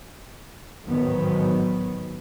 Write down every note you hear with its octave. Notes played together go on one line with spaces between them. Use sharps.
A1 G#2 D#3 F#3 B3